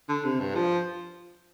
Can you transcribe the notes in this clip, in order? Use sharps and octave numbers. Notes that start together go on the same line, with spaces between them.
D3
C3
G2
F3